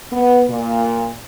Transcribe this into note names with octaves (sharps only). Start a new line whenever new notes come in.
B3
A#2